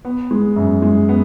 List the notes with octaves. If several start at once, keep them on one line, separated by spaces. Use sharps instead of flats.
B3
G#3
F#2
G#3
B3